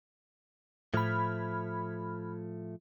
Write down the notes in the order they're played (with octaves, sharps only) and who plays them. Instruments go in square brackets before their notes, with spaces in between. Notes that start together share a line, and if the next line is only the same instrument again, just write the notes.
[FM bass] A2 [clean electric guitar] F3 A3 [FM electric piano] B5 F6 G#6